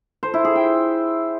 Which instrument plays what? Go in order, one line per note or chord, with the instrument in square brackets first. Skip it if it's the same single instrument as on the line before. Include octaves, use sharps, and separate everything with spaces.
[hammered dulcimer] C5
E4
G#4
G5